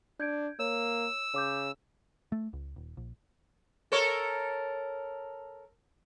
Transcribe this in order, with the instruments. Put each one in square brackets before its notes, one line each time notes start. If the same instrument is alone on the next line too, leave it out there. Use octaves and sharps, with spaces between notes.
[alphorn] D4 [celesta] G6 G#6 D7
[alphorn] A#3 [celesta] C#5 [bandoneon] E6
[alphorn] C#3 [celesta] C#5 D6 G6
[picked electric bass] A3
C#2
D#1
A#1
[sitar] A4 A#4 C#5